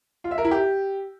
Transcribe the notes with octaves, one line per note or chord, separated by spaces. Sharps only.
F4
E5
A#4
E4
G4